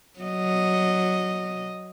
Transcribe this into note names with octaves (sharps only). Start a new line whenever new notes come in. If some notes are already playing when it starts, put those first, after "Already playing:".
F#3 D#5